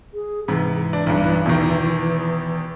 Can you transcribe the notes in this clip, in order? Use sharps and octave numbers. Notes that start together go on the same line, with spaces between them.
G#4
G#2 C3 E3
D4
B1 G2
E2 B2 D#3